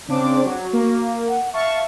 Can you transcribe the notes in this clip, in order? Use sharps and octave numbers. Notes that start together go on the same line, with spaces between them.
C#3 C4 D4 D6
F#3 F#4
A#3
F#5
E5 F5 A5 C#6